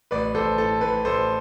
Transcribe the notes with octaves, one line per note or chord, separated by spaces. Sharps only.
A1 B4 D5
A1 A4 C5
A2 A4
A2 B4
A1 A4 C5